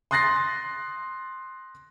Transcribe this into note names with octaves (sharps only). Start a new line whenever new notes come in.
C6 D#6 F#6 A6 A#6 C7